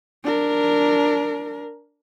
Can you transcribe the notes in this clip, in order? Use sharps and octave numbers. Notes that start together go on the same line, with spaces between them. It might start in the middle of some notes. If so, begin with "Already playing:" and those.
D4 A#4